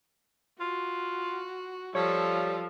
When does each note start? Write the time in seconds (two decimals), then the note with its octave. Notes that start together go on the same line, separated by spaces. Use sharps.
0.60 F4 F#4
1.95 F3 G3 F4 A4 C#5